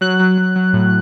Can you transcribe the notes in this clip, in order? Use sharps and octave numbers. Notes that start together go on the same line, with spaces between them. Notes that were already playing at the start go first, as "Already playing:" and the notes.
F#3 F#6
F#3
F#3
F#3
A2